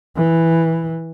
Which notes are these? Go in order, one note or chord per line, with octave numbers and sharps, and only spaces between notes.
E3